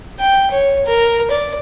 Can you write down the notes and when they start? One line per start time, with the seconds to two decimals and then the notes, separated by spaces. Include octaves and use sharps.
0.20 G5
0.51 C#5
0.86 A#4
1.31 D5